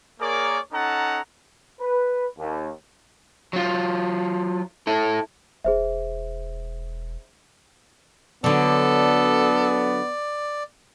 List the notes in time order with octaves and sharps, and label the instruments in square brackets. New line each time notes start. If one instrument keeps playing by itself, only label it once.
[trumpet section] A#3 G#4 A#4 C#5 D5 D6
C#4 D#4 A4 F#5 A5 A#5
[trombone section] B4
D#2
[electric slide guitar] F#3 F4
E4 A4
[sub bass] E1 [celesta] G#4 C5 E5
[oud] D3 F#3 [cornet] B3 [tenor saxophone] A4 [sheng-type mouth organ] D5